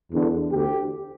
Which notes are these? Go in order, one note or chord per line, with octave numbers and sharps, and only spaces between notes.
E2 D3
D2 D3 G4